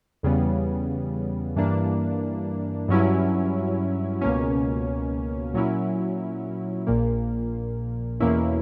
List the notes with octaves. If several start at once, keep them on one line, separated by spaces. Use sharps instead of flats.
E2 C#3 G3 B3
G2 E3 A#3 D4
G2 F#3 C#4 E4
C#2 B2 A#3 C#4
A#2 F#3 C#4 E4
A#1 A#2 A#3
E2 B2 A#3 C#4 E4